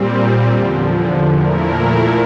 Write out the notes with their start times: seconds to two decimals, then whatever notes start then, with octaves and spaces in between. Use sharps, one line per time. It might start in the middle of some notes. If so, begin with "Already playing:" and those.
Already playing: A#2 G3 C4
0.47 E2 D3 F3
1.33 A#2 F3 A3 E4 A#4